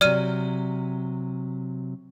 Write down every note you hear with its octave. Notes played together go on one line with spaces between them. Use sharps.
C3 F#3 D5 F6 D#7